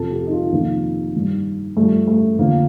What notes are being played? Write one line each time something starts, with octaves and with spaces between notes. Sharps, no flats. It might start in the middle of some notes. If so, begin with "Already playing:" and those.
Already playing: F2 C3 F3 A4
G4
D#4
F4
F2 C3 D#3 A#3
G2 D#3
G2 F3 A3
A3
F2 D3 F3 A#3